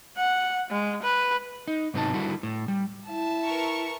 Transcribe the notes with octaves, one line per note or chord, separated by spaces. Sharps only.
F#5
G#3
B4
D#4
G#2 C3 F#3 B3 D#4 A5
D3 G3 E4 F#4
A2
G3
E4 E5 A5
A#4 B4 C#6